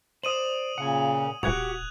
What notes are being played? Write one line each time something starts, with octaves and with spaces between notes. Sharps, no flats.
C5 D5 D#6 D#7 F#7
A#2 C#3 F#5 G#5
D#1 F#4 G4 F#5 F#6 G#6 F7